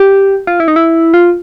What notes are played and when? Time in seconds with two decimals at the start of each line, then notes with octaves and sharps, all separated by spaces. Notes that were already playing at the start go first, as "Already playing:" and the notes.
Already playing: G4
0.47 F4
0.60 E4
0.68 D#4
0.76 E4
1.14 F4